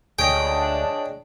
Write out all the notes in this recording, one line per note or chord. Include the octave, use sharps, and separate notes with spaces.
D2 D4 G#4 C#5 D#5 G5